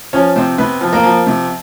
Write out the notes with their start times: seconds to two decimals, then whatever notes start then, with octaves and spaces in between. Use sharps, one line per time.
0.13 F3 C#4 C#5
0.36 C3 C4 C5
0.58 C3 B3 B4
0.81 F3
0.93 A#3 A#4
1.04 F3
1.27 C3